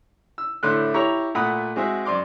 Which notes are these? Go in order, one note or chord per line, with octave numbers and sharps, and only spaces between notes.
E6
A2 D3 A3 E4 C6 F#6
E4 G4 C#5 A#5
A#2 A3 F#5 B5 D#6
G#3 C4 F#4 G#4 E5
F#2 D5 C6 D6